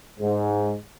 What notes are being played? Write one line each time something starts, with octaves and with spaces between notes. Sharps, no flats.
G#2